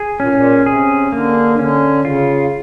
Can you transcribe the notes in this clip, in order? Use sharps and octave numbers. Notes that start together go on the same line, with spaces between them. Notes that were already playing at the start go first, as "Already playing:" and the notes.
Already playing: G#4
A#2 C#4
A2
A#2
C3 G#4
D3 A#3
C#3
D3 C#4
C#3 F4